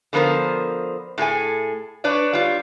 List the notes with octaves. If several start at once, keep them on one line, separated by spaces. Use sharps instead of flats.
D3 F3 B3 A#4 C5
A2 G#4 A4 G#5
D4 B4 C#5 D5
G3 F4